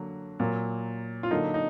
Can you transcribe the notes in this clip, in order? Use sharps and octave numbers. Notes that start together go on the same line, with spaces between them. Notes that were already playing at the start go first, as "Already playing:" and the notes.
Already playing: D3 F#3 A#3
A#2 F#3 A#3
F4
D3 F#3 A#3 D#4
D#4